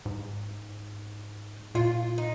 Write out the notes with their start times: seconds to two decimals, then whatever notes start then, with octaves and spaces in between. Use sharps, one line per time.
0.05 G#2
1.75 A#2 F4
2.18 D#4